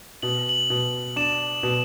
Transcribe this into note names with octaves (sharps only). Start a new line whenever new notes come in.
B2 F#7
F#7
B2
D4 E7
B2